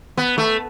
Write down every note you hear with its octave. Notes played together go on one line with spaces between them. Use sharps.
B3
A3